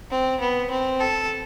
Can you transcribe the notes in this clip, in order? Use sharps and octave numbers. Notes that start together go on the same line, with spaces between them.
C4
B3
C4
A4